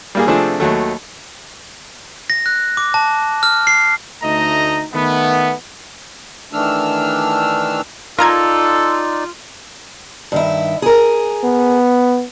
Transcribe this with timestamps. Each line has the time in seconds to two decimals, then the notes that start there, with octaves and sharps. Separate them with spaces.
0.15 G3 A#3 G#4
0.27 C3 F3 A3 C4 D4 G#4
0.60 D#2 F#3 A3
2.30 A#6
2.46 F#6
2.77 D6
2.94 A5
3.43 F6
3.67 C7
4.23 D2 A3 D#4 D#5 A#5
4.94 D#3 A3 B3
6.53 D#3 E3 A3 D4 E6 F6
8.19 D#4 F4 A4 A#4 D5 A#5 G#6
10.32 G2 D#3 E4
10.82 G#4 A#4
11.43 B3